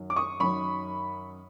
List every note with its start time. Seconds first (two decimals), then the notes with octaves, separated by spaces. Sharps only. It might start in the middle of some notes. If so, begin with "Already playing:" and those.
Already playing: F#2 D#3 F#3
0.10 D6
0.16 C#6 D#6
0.40 F#2 D#3 F#3 B5 C#6